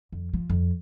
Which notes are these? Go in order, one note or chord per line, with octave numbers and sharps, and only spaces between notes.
F2
F3
F2